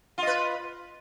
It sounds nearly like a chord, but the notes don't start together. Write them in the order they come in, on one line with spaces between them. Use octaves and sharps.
F4 D#5 B4